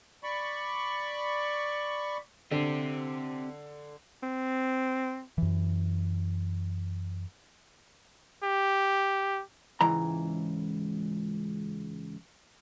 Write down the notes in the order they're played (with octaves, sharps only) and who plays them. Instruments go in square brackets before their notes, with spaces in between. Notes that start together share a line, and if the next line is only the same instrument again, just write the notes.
[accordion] D5 B5 C#6
[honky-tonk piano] D3 [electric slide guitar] C4 G4
[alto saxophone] C4
[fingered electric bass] F#2 E3
[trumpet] G4
[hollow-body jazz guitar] C#2 G#2 E3 A#5